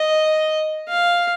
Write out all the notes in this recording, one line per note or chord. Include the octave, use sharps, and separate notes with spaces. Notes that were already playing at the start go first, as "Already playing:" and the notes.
Already playing: D#5
F5